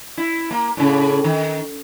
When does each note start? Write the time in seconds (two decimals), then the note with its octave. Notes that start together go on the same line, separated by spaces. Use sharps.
0.17 E4
0.51 A#3
0.77 A2 C#3
1.24 D#3